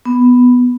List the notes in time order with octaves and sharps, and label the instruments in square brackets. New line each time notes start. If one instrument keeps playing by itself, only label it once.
[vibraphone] B3